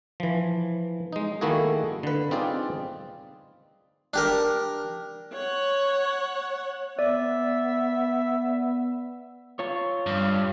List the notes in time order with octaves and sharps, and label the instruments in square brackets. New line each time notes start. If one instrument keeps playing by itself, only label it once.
[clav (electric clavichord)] E3 F3
G#3 D#4
D#3 A3 A#3 E4 F#4 G#4
D3 B4
C4 D#4 F4 G#4 D5
[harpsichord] D4 G4 A#4
[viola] C#5 F#5
[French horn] B3 [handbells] D5 [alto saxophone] E5
[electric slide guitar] F4 C#5
[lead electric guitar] G2